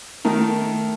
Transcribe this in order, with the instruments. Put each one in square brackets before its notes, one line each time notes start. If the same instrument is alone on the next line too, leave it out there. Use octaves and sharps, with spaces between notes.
[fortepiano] D#3 A#4 [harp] A3